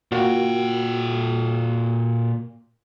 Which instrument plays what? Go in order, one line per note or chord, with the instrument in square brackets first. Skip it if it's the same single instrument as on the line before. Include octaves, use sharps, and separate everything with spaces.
[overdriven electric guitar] A#2 G5 [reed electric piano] A#3 F4 F#4